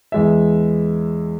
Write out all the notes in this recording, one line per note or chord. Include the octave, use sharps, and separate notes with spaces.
E2 G#3 E5